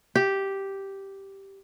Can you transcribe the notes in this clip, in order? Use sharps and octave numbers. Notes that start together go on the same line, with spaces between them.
G4